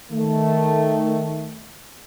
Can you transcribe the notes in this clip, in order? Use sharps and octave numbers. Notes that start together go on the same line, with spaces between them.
D#3 A3